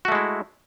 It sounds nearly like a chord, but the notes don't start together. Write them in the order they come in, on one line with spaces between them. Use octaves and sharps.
F#4 A3 G#3 E4